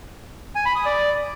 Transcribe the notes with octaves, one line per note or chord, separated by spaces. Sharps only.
G#5
B5
D#6
D5